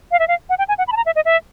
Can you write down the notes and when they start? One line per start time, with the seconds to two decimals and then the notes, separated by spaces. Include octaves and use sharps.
0.11 F5
0.19 E5
0.28 F5
0.49 F#5
0.58 G5
0.68 G#5
0.78 F#5
0.88 B5
0.92 A5
0.97 A#5
1.06 E5
1.16 D#5
1.25 E5